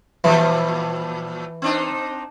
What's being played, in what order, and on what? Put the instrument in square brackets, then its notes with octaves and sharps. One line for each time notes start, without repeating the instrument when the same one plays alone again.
[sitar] A#2 F3 G3 [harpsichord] E3
[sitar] C4 D4 D#4